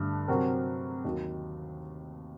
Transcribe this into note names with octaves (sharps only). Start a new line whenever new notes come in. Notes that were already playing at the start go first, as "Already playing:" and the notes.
Already playing: G2 D3 A3
C3 F#3 C4 F#4 A#4
D#2 D#3 F#3